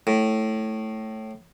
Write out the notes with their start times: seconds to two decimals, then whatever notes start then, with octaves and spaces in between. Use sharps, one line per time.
0.07 A2